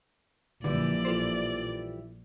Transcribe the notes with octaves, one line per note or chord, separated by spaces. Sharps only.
A#1 D3 E3 G3 E4 D5
F4 A4 C5